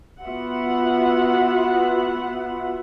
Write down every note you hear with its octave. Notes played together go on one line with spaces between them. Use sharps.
B3 F4 F#4 B4 E5 F#5